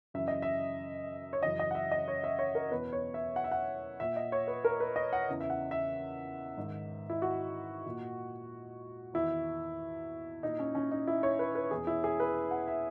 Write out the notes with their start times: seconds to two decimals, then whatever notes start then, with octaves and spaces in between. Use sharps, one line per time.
0.14 F#2 C#3 E3 E5
0.28 D#5
0.42 E5
1.33 C#5
1.43 F#2 C#3 E3 D#5
1.59 D#5
1.71 F#5
1.75 E5
1.91 D#5
2.08 C#5
2.24 E5
2.39 C#5
2.55 A#4
2.71 E2 B2 B4
2.92 C#5
3.14 E5
3.36 F#5
3.44 E5
3.51 F#5
4.00 A#2 E5
4.16 D#5
4.32 C#5
4.48 B4
4.65 A#4
4.80 B4
4.96 D#5
5.13 F#5
5.29 E2 C#3 E3
5.41 E5
5.50 F#5
5.71 E5
6.57 G#2 D#3
7.10 E4
7.22 F#4
7.86 A#2
9.14 E2 D#3 E4
10.43 A#2 D#4
10.59 C#4
10.75 C#4
10.91 D#4
11.07 E4
11.23 C#5
11.39 B4
11.55 B4
11.71 E2 B2 G#4
11.87 E4
12.04 G#4
12.20 B4
12.51 F#5
12.68 E5